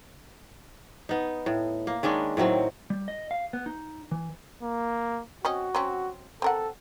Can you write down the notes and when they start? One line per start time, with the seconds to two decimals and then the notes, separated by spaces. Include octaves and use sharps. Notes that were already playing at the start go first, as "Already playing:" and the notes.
1.09 B3 D#4
1.46 A2
1.87 A#3
2.03 D#3 G#3 C#4 D4
2.37 A2 D#3 F#3 C4
2.90 G3
3.08 D#5
3.31 F5
3.53 B3
3.66 D#4
4.11 E3
4.62 A#3
5.45 C4 C#4 F#4 D#5
5.75 F#3 C4 C#4
6.42 C4 A4 A#4 F#5